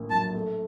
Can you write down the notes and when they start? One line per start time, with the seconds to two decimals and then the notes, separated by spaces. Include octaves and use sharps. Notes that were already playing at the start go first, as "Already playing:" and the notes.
Already playing: A#1 A2 A#3
0.10 F#3 A5
0.34 A3